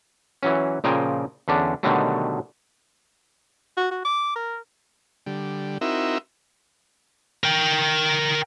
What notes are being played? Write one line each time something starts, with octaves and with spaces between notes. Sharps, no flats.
E3 F#3 C#4
A#2 C#3 F3 A#4 G5 G#5
E2 D3 C#4 D4
B2 D3 D#3 F#3 G3 A3
F#4
F#4
D6
A#4
D3 G3
C4 D#4 E4 F#4 A#4 E5
A#4 G5